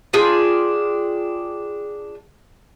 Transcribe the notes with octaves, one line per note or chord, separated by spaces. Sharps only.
D4 F4 G#4 G5